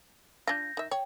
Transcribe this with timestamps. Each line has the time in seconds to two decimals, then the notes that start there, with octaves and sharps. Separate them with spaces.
0.47 D4 F4 G6 A#6
0.77 D#3 E5
0.91 C#5 G5